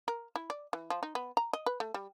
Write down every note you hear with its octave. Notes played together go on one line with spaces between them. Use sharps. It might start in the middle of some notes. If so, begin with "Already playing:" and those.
A#4
E4
D5
E3
F3
D#4
B3
A#5
D#5
B4
A3
G3